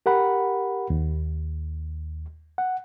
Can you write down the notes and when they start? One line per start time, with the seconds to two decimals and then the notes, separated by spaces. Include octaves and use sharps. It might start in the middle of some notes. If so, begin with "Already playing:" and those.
0.06 G4 A#4 F#5 B5
0.90 D#2
2.58 F#5